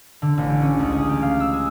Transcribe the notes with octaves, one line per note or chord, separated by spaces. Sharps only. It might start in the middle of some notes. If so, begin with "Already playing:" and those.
D3
A1
G4
C#4
C#2
G#4
G4
F5
E6
G#4